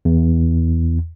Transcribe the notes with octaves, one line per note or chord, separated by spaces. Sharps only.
E2